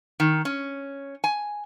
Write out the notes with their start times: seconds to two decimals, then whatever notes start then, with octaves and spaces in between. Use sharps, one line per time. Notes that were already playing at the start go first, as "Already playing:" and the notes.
0.20 D#3
0.45 C#4
1.24 G#5